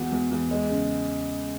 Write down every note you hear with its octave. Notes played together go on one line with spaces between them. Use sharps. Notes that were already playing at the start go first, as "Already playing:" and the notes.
Already playing: E2 F#4
E2
E2
G#3
C#3